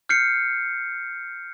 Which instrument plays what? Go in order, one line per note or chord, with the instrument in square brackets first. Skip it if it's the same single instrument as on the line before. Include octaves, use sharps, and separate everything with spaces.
[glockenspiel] F6 G6 C7 C#7